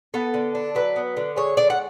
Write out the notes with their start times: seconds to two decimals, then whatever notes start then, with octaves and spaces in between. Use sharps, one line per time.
0.14 B3 A4
0.34 D3
0.55 D4
0.75 F#3 B4
0.96 B3
1.17 D3
1.36 G#3 C#5
1.57 D3 D5
1.70 F#5